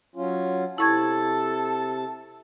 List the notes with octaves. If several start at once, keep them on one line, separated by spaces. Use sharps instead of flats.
F#3 C#4 F4
C3 E4 A4 A5 C#6 G#6